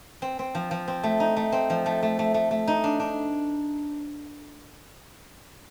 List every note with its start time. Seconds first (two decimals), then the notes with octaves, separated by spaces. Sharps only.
0.22 C4
0.39 C4
0.55 F3
0.71 F3
0.88 C4
1.03 A3
1.20 D#4
1.37 A3
1.52 C4
1.70 F3
1.86 A3
2.03 A3
2.19 A3
2.34 A3
2.51 A3
2.68 D#4
2.84 D4
3.00 D4